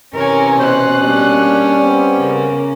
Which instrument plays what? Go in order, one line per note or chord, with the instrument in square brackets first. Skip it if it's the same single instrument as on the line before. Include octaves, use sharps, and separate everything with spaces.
[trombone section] C3 E3 [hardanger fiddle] C#4 [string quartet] A#4 C#5 G#5
[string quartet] B2 F#6 [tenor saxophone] C5
[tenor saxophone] G3 [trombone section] A#3 D4
[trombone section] B3 C4
[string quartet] C#3 A#3